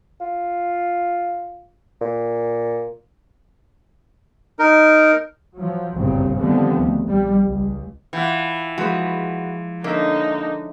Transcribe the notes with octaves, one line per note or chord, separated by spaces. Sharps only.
F4
A#2
D#4 A#4
F3 F#3
G1 C2 F#2 A#2 C#3 C4
D3 D#3 F3 G3 B3 C4
D2
A#1 G3
C#2
E3 F4 F#5 G5
F3 G#3 F#4 B4
D3 A#3 C#4 D#4 E5